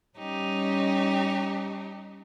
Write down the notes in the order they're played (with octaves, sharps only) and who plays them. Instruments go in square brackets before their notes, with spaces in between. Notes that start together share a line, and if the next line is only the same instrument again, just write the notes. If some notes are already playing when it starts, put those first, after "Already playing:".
[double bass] G3 C#4 [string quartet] D#4 G4